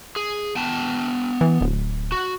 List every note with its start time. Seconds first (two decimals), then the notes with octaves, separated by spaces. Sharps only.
0.16 G#4
0.56 B3 G5 A5
1.41 E3
1.61 D1
2.12 F#4